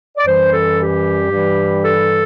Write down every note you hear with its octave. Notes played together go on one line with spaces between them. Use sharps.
D5
F#2 E3 G3 C5
A4
G4
G2 E3 G3
A4